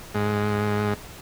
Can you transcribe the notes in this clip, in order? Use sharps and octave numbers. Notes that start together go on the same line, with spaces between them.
G#2